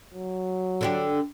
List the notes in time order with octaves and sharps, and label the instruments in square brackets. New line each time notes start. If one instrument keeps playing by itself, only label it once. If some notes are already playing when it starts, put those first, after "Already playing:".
[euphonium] F#3
[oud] D3 D4 G4